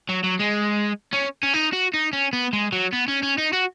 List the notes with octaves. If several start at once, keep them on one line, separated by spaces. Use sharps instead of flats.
F#3
F#3
G#3
C#4
C#4
D#4
F#4
D#4
C#4
B3
G#3
F#3
B3
C#4
C#4
D#4
F#4